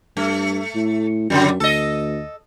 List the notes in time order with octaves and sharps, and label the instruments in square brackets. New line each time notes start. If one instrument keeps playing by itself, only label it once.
[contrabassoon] G2 [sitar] A3
[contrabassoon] A2
[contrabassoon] F#2 [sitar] C#3 F#3 G3
[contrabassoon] D2 [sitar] A4 D#5